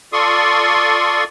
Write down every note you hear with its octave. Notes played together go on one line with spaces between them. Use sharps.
F4 A4 D5 C6 C#6 D#6